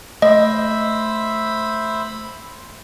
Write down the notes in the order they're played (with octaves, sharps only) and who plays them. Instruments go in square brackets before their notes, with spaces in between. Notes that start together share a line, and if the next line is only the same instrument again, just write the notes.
[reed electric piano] A3 [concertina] C5 E5 B5 [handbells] D#5